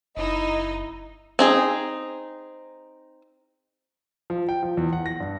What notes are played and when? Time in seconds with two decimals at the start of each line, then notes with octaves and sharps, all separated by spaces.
0.17 F#1 D#4 E4 D#5
1.39 C4 D#4 G#4
4.30 F3
4.49 G5
4.63 F3
4.77 E2
4.93 F#5
5.06 A#6
5.20 G2